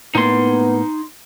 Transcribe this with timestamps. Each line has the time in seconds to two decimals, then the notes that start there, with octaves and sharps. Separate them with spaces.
0.15 A2 A#3 B3 D#4 C6